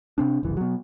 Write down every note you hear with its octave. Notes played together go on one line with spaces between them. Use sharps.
C3 C4 D4
F#1 C2 E3
B2 F#3